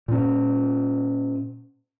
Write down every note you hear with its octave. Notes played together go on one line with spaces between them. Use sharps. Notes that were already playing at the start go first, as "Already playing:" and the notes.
A#2 C#4